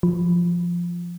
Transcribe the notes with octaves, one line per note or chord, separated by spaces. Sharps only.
F3